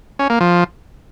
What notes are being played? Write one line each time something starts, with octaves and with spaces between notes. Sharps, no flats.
C#4
A#3
F3